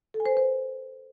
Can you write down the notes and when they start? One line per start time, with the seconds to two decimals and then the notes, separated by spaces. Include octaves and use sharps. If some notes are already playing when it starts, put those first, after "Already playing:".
0.14 A4
0.20 G#5
0.26 C5
0.31 B4
0.37 C5